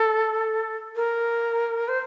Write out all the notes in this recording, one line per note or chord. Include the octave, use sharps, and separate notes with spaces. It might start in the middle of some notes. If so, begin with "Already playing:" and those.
Already playing: A4
A#4
C5